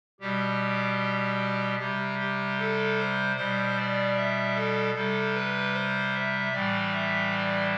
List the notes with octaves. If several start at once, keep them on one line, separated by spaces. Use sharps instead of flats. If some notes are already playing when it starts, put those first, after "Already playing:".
B2 G3 G4
C3 G3 G4
G4
A4
C5
B2 G3 C5
D5
E5
A4
C3 G3 A4
B4
C5
E5
A2 E3 G3 D5
E5
D5